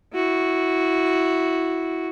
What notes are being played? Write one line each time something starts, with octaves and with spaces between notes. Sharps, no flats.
E4 F#4